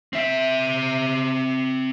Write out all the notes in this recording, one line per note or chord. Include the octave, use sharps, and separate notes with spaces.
C4 E5